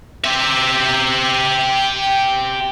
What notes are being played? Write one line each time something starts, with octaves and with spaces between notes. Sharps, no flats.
G4 E5